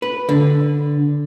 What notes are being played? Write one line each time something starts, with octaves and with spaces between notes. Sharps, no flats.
B4
D3